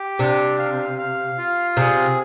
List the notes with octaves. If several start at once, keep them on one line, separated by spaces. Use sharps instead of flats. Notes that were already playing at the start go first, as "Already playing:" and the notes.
Already playing: G4
C3 D4
F5
F5
F4
C3 G#4